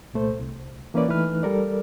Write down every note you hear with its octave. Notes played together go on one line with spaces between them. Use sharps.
C2 A#2 A3 C5
C2
E3 A#3 C#4 B4 D5
E3 A3 D#4 B4 F6
G3 A4 A#4 D5